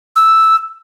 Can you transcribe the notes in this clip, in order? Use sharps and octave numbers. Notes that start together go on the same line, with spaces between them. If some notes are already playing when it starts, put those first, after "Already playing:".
E6